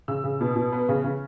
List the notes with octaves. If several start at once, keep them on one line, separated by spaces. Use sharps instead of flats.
C#3 E6
C#3
B2
B2
B3
C#3
C#3